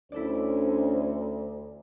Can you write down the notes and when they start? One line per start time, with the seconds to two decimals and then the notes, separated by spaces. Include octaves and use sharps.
0.12 D2 C#4 D4 E4 A4 C5 D5